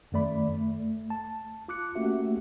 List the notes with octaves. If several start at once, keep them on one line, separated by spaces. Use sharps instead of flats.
F#2 D#3 A3 D5 B5
A3
A5
F4 D6 F#6 C#7
A3 A#3 C#4 F#4 G4 E5